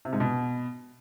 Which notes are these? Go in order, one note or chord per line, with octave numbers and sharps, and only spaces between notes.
C3
G#2
B2